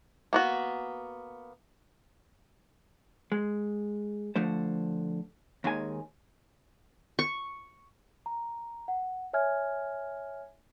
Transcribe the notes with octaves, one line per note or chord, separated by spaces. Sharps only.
A#3 B3 F#4
G#3
D3 F3 A3 C5
D#2 D#3 G#3 G#5
C#6
A#5
F#5
C#5 E5 G#5 F6 G#6